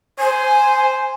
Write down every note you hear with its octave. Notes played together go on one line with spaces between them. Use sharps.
C5 G#5